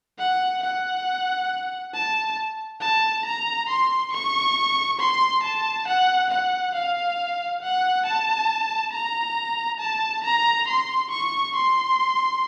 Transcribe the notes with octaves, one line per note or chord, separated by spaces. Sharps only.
F#5
F#5
A5
A5
A#5
C6
C#6
C6
A5
F#5
F#5
F5
F#5
A5
A#5
A5
A#5
C6
C#6
C6